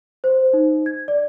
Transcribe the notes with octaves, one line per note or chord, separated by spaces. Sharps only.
C5
D#4
G#6
D5